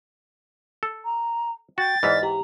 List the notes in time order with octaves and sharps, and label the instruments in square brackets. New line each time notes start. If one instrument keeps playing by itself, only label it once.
[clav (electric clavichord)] A4
[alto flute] A#5
[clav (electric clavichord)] F#4 [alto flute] G5 [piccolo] A6
[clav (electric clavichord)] G#2 E3 [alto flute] D5 [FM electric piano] D#5 F6 B6
[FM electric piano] G4 [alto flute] A#5